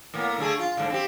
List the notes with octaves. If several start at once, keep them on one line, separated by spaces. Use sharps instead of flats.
A2 A#3 B3
D3 A3 G#4
F4
G#2 D3
C4 G4